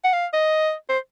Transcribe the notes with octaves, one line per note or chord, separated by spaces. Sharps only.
F#5
F5
D#5
C5